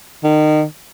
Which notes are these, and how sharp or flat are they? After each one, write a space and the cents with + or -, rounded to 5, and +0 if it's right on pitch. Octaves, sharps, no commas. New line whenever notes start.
D#3 -30